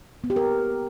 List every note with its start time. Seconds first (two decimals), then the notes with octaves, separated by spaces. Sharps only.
0.24 B3
0.30 G4
0.36 A#4